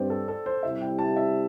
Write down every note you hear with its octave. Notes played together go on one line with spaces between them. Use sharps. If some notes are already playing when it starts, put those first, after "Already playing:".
Already playing: G2 G3 C4 G4 C5 D5 G5
A4
A4
C5
C3 G3 E4 G4 E5
G5
A5
E5